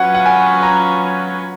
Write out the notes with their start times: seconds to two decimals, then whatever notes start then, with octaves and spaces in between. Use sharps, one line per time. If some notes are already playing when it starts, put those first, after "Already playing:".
Already playing: F#3 C#4 F4 B4 F#5
0.15 F#5
0.26 G#5
0.63 A#5